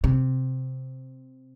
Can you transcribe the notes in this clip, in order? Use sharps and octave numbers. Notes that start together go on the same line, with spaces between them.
C3